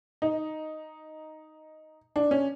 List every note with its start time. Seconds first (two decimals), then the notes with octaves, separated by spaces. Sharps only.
0.22 D#4
2.16 D4
2.31 C#4